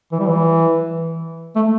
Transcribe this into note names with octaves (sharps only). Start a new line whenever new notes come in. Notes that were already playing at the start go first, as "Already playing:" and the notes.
E3
G3
E3
A3